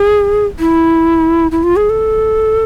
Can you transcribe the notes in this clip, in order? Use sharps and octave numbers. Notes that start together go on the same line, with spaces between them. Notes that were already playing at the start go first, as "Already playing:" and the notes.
Already playing: G#4
E4
E4
F4
G#4
A4